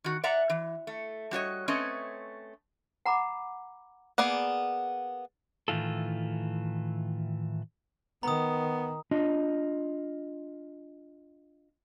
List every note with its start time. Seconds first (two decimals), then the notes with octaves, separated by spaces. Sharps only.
0.04 D#3 F#4
0.24 D5 E5 F#5 A#5
0.50 E3
0.87 A3
1.31 G3 F#4 C#5 D#5
1.68 A3 C4 C#4 B4 C#5 D#5
3.06 F#5 A#5 B5 D6
4.18 A#3 B3 G#4 D5 F#5
5.68 A2 D#3 E3 F4 A4
8.23 D#3 B3 A#5 D#6
9.11 D4 F4 D#5